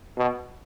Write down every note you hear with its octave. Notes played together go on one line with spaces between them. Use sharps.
B2